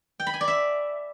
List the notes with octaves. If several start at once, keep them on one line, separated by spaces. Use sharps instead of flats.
G5
B5
G#5
D5
E5